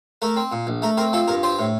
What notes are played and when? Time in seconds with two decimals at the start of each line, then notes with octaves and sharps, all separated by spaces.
0.22 A3 A#4
0.36 C4
0.52 A#2
0.67 A#1
0.82 A3 A#4
0.97 C4 A#4
1.13 F3 A4
1.28 G2 A#4
1.43 C4 C5
1.59 A2